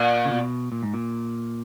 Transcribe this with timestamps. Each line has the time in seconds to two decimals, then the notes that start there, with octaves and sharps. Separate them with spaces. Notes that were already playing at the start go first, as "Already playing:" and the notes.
Already playing: A#2
0.26 C#3
0.31 B2
0.72 A#2
0.83 G#2
0.94 A#2